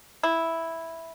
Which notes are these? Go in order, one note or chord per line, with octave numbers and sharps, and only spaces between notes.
E4